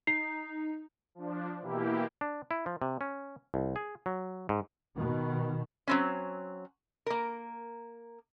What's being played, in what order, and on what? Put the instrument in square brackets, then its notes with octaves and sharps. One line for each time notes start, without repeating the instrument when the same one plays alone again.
[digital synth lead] D#4 [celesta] C7
[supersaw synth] F3 D4
B2 E3 A#3 E4 G4
[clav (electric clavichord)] D4
E4
F3
C3
C#4
C2
G#4
F#3
G#2
[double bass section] B2 D#3
[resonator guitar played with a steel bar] F#3 C4 C#4
A#3 A#4